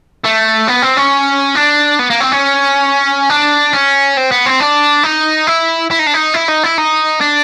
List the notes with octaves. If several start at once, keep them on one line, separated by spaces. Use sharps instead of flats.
A3
B3
C4
C#4
D4
B3
A#3
C4
C#4
D4
C#4
C4
B3
C4
D4
D#4
E4
E4
D#4
D4
D#4
E4
D#4
E4
D#4
D4